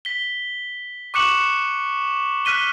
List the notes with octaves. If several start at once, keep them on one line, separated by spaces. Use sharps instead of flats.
B6 G7
C#6 D6 F#6 C#7 E7 F#7
F6 F#6 B6 D#7 G7